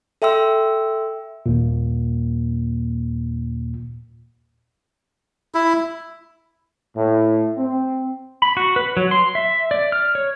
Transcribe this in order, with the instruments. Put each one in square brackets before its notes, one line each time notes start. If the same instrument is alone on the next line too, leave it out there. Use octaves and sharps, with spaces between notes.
[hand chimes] A4 E5 G5 C6 E6
[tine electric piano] D#2 A#2
[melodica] E4
[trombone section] A2
C4
[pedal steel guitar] B5
F#4
B4
F#3
C6
E5
D5
F6
C#5